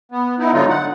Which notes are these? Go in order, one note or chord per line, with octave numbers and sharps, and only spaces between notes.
B3
B3 D#4 E4
G#2 D3 F#3 D#4 F4
F#5